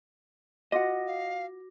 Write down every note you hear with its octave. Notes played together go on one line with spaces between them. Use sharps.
F4 F#4 D#5 F#5 D6 A#6
F5